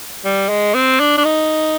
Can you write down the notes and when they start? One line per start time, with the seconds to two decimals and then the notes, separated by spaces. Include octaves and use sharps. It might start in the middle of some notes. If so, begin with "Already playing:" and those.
0.24 G3
0.49 G#3
0.74 C4
1.00 D4
1.17 D4
1.25 D#4